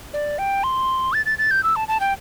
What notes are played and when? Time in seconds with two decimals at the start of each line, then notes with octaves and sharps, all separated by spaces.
0.14 D5
0.39 G5
0.64 C6
1.13 A6
1.26 A6
1.38 A6
1.51 G6
1.64 E6
1.76 A5
1.88 A5
2.00 G5